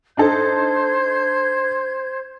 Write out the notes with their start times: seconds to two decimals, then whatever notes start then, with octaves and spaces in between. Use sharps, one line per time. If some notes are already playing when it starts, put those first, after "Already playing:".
0.17 D4 D#4 A4 C5 G6 G#6